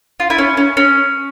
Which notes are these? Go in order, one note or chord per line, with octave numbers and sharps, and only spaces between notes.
F4
E4
C#4
C#4
C#4